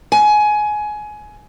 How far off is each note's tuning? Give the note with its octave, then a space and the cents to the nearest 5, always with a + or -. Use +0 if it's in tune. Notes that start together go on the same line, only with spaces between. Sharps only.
G#5 +20